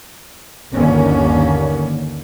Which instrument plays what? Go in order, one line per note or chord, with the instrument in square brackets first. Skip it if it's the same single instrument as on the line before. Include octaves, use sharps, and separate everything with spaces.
[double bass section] G1 D#2 D3 D#3 A#3 C#4